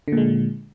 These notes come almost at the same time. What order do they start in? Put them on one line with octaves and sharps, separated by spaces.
D3 A#2 G#3